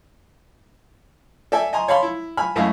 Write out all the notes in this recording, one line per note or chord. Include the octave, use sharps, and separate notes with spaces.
A4 D5 E5 G#5
D#5 G#5 A#5 C6
C#5 F5 A5 B5 C6
E4
G#5 B5 F6
F#2 G#3 A3 E4 F5